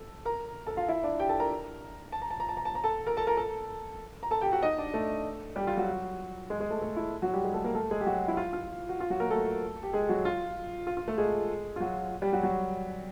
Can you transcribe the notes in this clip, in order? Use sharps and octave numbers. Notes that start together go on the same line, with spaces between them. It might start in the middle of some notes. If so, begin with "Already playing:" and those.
Already playing: A4
A#4 A#5
A4 A5
F4 F5
E4 E5
D4 D5
G4 G5
A4 A5
A#4 A#5
A5
A#5
A5
A#5
A5
A#5
A5
A#5
A4 A5
A#4 A#5
A4 A5
A#4 A#5
A4 A5
A#5
A4 A5
G4 G5
F#4 F#5
D#4 D#5
D4 D5
A3 A4
G3 G4
F4
F#3 F#4
G#3 G#4
G#3 G#4
A3 A4
A3 A4
E4
F#3 F#4
G3 G4
G#3 G#4
A3 A4
A#3 A#4
A3 A4
G#3 G#4
G4
F#3 F#4
E4
F4
F4
F#4
F4
F#3 F#4
A#3 A#4
A3 A4
G4
G#3 G#4
F#3 F#4
F4
F4
F4
A3 A4
G#3 G#4
F4
F#3 F#4
G3 G4
F#3 F#4
F#3 F#4